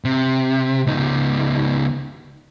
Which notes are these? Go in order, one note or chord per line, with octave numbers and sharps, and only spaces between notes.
C3
C#2 D#4